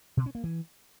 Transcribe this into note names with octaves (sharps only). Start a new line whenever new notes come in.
B2
C#4
A#3
E3